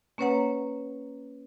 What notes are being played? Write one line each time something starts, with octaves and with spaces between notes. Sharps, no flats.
A#3 C#4 B4 C#5 F#5 A#5